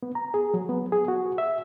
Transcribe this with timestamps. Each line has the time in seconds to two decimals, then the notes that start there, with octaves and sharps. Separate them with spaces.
0.03 B3
0.15 A#5
0.34 G#4
0.54 F#3
0.69 B3
0.92 G#4
1.08 F#4
1.38 E5